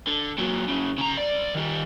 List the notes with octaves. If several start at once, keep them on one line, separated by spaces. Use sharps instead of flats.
D3
A#2 F#3
F#2 C#3
C#3 A#5
C2 D5
D#3 G3